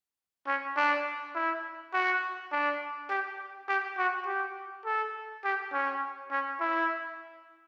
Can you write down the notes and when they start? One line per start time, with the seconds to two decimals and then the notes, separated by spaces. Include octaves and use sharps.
0.47 C#4
0.77 D4
1.35 E4
1.93 F#4
2.52 D4
3.10 G4
3.68 G4
3.98 F#4
4.26 G4
4.85 A4
5.44 G4
5.72 C#4
6.31 C#4
6.60 E4